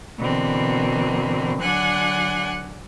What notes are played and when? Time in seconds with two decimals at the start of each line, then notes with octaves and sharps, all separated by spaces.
0.19 B2 D3 E3 A#3 C4
1.60 D3 F#3 D4 F#5 G#5 F#6